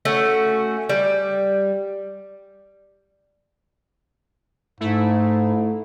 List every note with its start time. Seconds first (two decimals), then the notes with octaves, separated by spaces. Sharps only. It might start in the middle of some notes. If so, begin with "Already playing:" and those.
0.05 A3 C#4 F#4
0.90 G3
4.80 G#2 A3 E4